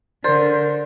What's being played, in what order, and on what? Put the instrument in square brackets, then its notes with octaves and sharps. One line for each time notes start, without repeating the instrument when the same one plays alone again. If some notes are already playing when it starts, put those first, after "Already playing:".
[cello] D3 [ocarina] A#4 [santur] C5 [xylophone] D5